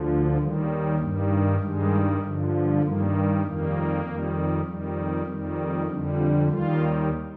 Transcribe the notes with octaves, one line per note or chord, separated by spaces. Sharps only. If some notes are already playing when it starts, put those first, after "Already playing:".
Already playing: D2 D3 F3
D#2 D#3 G3
G2 D#3 G3
G2 D#3 G3 G#3
G2 D3 F3
G2 D#3 G3 A#3
F2 D#3 G3 A#3
F2 D#3 G3
F2 D#3 G3
F2 D#3 G3
F2 D3 G3 D4
F4
D#2 D#3 G3 F4